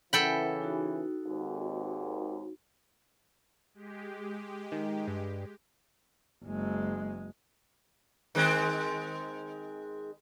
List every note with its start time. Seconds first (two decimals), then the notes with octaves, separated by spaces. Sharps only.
0.13 C#3 E3 A4 A#4 F#5 G5 B5
0.62 D#4 F#4
1.24 G#1 D#2 G#2
3.74 G#3 G4
4.72 D#3
5.08 G2
6.44 F#1 G#3
8.35 D#3 G#3 C4